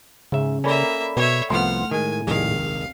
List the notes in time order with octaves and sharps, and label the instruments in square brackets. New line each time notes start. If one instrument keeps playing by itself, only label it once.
[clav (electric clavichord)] G#2 E5 [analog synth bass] C#3
[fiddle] A#3 E5 [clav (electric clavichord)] C#4 [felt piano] A4 D5 B5
[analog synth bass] B2 [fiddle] C#5 E5
[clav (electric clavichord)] C2 F3 B3 [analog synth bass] A2 [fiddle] F#5 F6 [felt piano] C6
[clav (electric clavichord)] D#3 G#3 [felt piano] A#4 [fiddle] G#5
[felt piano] F1 A#1 D#2 [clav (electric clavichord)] D#3 G#3 [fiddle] F5